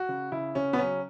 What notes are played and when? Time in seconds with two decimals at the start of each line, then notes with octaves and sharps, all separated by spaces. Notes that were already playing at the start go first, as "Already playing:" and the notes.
Already playing: F#4
0.09 C#3
0.32 C#3 E4
0.55 C#3 C#4
0.73 B3
0.78 F#3 C#4